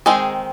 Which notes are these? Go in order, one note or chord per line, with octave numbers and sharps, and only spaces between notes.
D#3 G#3 C4 D#4 G#4